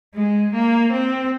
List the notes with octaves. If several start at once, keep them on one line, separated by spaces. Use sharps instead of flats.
G#3
A#3
C4